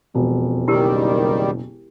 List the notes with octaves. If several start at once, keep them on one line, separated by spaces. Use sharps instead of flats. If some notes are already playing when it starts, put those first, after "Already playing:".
E1 F2
F#1 D#3 G3 E4 G4 A#4